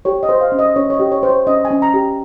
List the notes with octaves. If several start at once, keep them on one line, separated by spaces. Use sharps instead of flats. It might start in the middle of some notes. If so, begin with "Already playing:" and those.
G4 C#5
D#5
C5
F5
C#4
D#5
C#4 C#5
C#5
D#5
G4
C#5
C5
C#5
C#4 D#5
G#5
C#4
A#5
G4